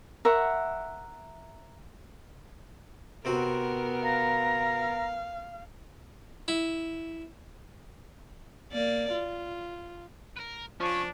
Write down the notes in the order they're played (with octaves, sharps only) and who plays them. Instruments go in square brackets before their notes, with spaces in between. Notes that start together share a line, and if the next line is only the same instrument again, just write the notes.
[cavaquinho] A#4 E5 F#5 C#6
[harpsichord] C3 C4 F#4 [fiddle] B3 A#4
[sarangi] F5 [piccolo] A#5
[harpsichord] E4
[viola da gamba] A#3 D5
F4
[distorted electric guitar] A#4 B4
[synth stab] F3 [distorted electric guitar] C#4 [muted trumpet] D4 [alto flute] C#6